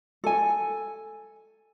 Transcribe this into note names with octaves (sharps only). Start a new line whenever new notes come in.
A4 G#5